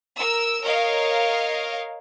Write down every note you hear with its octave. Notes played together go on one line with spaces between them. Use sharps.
A#4 E6
A#4 C#5 D#5 F5